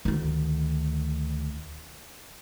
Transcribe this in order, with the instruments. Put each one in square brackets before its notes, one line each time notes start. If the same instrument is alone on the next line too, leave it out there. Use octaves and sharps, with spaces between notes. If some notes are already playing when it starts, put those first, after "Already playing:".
[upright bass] D2 D#3